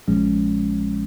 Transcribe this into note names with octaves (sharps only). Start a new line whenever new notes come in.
A#1 A#2 F3 G#3 C#4